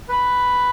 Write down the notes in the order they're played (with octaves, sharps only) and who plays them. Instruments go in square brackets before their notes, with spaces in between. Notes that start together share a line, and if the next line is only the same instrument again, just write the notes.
[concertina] B4